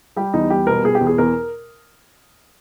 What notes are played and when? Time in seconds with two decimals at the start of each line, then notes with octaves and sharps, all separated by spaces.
0.16 G3 G4
0.33 E2 D#4
0.50 G3 G4
0.67 B2 A#4
0.84 B2 G#4
0.95 G4
1.01 E2
1.07 G#4
1.18 E2 A#4